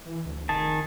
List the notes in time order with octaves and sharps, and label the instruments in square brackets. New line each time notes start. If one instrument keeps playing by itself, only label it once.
[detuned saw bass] E3
D2
[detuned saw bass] F1 [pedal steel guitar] D#3 G#4 A5